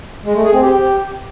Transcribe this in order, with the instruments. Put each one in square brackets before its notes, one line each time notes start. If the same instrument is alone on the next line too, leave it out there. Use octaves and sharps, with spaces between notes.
[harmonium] G#3
A3
G#4
C4
G4